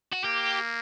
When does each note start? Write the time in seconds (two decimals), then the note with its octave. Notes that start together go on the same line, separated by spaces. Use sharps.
0.13 F#4
0.25 A#3 G4